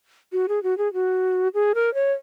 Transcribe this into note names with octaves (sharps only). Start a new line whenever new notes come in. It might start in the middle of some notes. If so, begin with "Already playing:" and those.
F#4
G#4
F#4
G#4
F#4
G#4
A#4
C#5